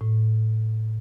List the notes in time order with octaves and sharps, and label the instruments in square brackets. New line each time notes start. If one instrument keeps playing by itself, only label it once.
[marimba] A2